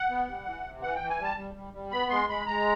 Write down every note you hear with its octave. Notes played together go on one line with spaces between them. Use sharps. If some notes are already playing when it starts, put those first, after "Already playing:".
Already playing: F#5
B3
G3
E3
C3
E3 F#5
G5
E3
G#5
G3 A5
G3
G3
G3
B3 B5
G#3 C6
G#3 B5
G#3 A#5